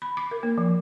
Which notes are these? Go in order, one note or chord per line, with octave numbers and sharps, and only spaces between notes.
B5
D6
A#4
A#3
F3